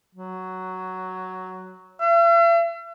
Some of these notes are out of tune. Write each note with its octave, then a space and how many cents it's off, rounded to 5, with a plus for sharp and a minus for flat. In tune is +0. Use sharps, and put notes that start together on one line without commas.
F#3 +5
E5 +45